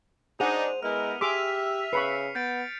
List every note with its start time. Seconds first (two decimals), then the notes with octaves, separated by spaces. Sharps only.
0.40 D4 D#4 G#4 C5 F#5 D#7 F7
0.83 G#3 B3 E4 A#4 F6
1.21 G4 G#4 E5 C6 D6 B6 D#7 F7
1.93 C#3 B4 B5 C#6 C7 C#7
2.35 B3 G6 A6 D7